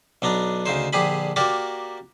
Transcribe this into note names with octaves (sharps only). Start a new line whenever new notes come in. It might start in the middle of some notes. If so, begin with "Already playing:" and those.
B1 B3 D4 A#5
D2 C#3 D#4 C5
A#1 D3 G4 G#4 B5
A#3 F#4 G4 A#4 D5